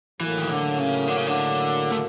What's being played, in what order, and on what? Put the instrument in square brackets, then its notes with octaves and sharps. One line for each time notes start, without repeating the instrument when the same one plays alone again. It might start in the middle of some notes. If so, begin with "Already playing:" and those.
[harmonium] A2 F#3 A#3 [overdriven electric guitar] E3
[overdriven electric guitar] D#3
D3
C#3
D3
C#3
D3
A3